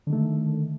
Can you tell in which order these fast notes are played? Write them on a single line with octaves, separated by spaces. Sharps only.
D3 D#3 A3